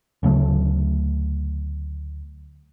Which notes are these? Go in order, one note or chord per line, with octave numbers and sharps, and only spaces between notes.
D2 C#3 F#3 A3